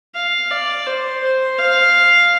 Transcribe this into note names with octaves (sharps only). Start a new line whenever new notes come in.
F5
D5
C5
C5
F5